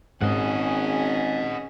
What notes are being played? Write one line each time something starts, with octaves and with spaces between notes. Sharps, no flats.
G#1 G#2 C#4 G#4 D#5 F#5